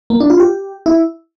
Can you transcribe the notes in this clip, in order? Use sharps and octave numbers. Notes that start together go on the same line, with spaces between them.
A#3
D4
F4
G4
E4